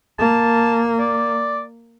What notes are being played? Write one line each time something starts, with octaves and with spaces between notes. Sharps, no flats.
A#3 A5
D5